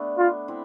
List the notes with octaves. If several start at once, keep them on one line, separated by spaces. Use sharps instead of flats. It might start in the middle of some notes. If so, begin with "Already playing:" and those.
Already playing: A3 B3 D4
F4
C4 E4